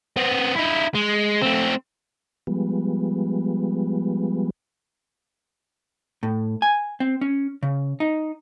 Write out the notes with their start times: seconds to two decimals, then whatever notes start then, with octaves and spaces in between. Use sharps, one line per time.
0.17 B3 C4
0.56 D#4 E4
0.95 G#3
1.42 A3 C4
2.47 F3 G3 G#3 B3
6.23 A2
6.62 G#5
7.00 C4
7.21 C#4
7.63 C#3
8.00 D#4